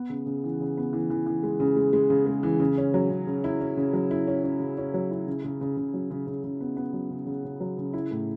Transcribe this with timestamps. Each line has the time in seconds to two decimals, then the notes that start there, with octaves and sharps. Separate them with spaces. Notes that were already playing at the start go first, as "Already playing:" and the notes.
Already playing: B3
0.10 C#3
0.26 C#3
0.44 E3
0.60 C#3
0.77 B3
0.93 E3
1.10 E3
1.26 E3
1.43 G#3
1.60 C#3
1.76 G#3
1.93 G#3
2.10 C#3
2.26 G#3
2.43 E3
2.60 C#3
2.78 C#4
2.94 F#3
3.10 C#3
3.27 C#3
3.44 E4
3.61 C#4
3.77 C#3
3.93 F#3
4.11 E4
4.27 C#4
4.44 C#4
4.60 C#3
4.78 C#4
4.94 F#3
5.11 E4
5.27 C#3
5.44 C#3
5.61 C#3
5.77 C#3
5.94 F#3
6.11 C#3
6.27 C#3
6.44 C#3
6.61 B3
6.77 B3
6.93 F#3
7.10 C#3
7.27 C#3
7.44 C#3
7.60 F#3
7.78 C#3
7.93 E4
8.11 A2